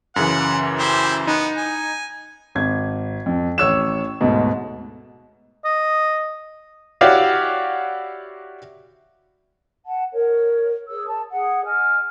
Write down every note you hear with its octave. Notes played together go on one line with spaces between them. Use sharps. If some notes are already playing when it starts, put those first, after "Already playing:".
F#2 C#3 E3 F#5
E4 G4 C5
B3 D#4
G#5
G#1 G#6
F2
A1 C#5 E6 E7
D2 G#2 B2
D#5
E4 F#4 G4 C#5 D5 F5
F#5 A5
A#4 C#5
G#4 C#5 E6
A5
G#4 F#5
D#5 G#5 F6